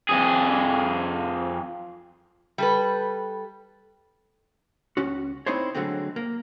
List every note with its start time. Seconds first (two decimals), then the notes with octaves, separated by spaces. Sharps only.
0.09 F2 G#4
2.58 G3 A4 B4
4.97 C#2 C#4 F#4
5.46 C4 D#4 E4 C5 C#5
5.75 D3 F#3 G#3 A3 C4
6.16 A#3